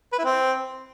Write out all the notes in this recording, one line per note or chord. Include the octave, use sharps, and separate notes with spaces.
B4
E4
C4